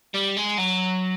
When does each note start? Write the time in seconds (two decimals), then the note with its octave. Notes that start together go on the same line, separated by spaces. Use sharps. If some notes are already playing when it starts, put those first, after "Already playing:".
0.14 G3
0.37 G#3
0.58 F#3